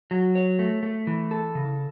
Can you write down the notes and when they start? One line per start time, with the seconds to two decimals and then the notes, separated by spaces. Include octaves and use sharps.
0.11 F#3
0.35 C#5
0.59 A3
0.83 A3
1.07 E3
1.31 A4
1.55 C#3